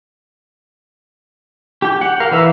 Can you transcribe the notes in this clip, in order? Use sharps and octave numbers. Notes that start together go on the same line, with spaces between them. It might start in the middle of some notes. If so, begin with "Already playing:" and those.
G4 G5
F#5
A#4 F5
E3 B4 E5 F5